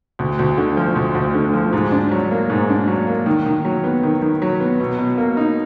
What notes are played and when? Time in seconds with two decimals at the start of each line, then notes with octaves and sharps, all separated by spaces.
0.19 D2
0.39 D2
0.58 D3
0.77 F3
0.96 D2
1.15 D2
1.34 D3
1.54 F3
1.73 G#2
1.92 D4
2.11 F#3
2.31 A#3
2.50 G#2
2.69 D4
2.87 F#3
3.07 A#3
3.26 D#3
3.46 D#3
3.64 F#3
3.84 B3
4.03 D#3
4.22 D#3
4.42 F#3
4.60 B3
4.80 B2
4.98 B2
5.18 A#3
5.37 D#4